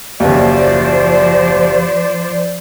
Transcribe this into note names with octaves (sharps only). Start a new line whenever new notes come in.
F#1 D#2 F3 C5 D5